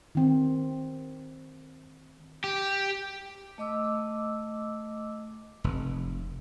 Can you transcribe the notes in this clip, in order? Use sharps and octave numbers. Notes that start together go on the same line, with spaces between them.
D#3 C4
G4
A3 D#5 D6 E6
F1